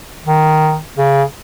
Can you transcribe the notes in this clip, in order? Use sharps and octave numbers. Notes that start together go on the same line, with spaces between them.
D#3
C#3